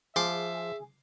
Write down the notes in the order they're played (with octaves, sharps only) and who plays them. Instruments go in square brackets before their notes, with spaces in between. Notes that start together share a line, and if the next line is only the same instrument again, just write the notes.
[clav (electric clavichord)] F3 [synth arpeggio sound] G#4 [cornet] E5 [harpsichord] C6 D6